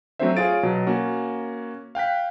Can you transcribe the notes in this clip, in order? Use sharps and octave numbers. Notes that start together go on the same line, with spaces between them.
F#3 A3 C4 D4 C5 E5
F4 G#4 C#5 F5 A6 D7
B2 F#3
A#3 C#4 F#4
F5 G5 F#6 B6